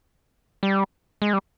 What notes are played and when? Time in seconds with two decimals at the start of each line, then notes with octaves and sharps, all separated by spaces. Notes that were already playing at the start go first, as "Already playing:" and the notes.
0.63 G3
1.22 G#3
1.33 G3